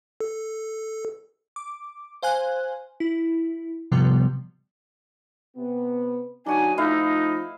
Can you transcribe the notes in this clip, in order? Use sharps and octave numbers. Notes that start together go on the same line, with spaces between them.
A4
D6
C5 F5 G#5 F#6
E4
G#2 C3 F3 G3 B3
C3 B3
F#2 F#3 D4 D#4 F#4 G#5 D#6
F3 A3 D#4 E4 D#5 F5